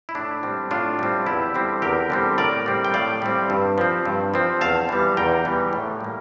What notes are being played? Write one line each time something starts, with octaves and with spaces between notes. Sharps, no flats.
E4
A2 D4
G3 C4
A2 D4 F4
G3 C4
E2 E4 G4
D3 G3 C4
E2 G4 A#4
D3 G3 C4
A2 A#4 D5
G3 C4
G5
A2 D5 F5
G3 C4
G2
F3 C4
G2
F3 C4
E2 F5 A5
E3 G3
E2 G5 A#5
E3 G3
A2
G3 A#3